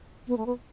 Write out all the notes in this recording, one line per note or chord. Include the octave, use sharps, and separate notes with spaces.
B3
A3
B3